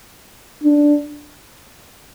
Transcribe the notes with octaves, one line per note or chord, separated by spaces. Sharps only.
D4